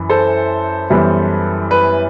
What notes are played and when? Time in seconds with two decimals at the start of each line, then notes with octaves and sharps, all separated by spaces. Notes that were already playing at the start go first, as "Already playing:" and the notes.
Already playing: F#2 E3
0.09 A4 C5
0.90 F#2 E3 G3 B3
1.71 B4